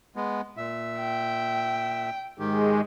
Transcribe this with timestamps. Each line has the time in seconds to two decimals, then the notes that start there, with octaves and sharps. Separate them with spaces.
0.16 G#3 B3
0.57 A#2 E5
0.99 G5
2.39 G#2 D#3 G#3 G4